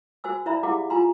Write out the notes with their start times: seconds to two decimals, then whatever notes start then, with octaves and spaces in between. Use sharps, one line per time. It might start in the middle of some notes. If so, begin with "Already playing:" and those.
0.24 F#4 C5 G#5 E6
0.46 E4 C5 D5 E5 A#5 B5
0.63 E4 G4 G#4 F5 F#5 D6
0.90 F4 G#5 A#5 C6